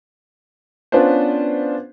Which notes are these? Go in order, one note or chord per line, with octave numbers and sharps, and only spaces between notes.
B3 C#4 D4 F4 B4 C5